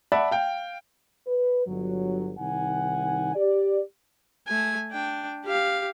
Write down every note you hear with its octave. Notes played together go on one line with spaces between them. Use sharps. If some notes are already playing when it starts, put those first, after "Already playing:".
D5 E5 F#5 A5 B5
F5 G5
B4
G1 F#3
C2 D#3 D#4 F#5 G#5
G4 D5
A3 G#5
D4 G5
G4 F5